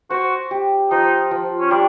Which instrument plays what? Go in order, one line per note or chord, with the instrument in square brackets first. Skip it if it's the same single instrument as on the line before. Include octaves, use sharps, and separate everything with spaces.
[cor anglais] F#4 [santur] C5
[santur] G4
[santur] F3 [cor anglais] D#4
[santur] F3
[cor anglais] C#4
[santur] G3 [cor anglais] D4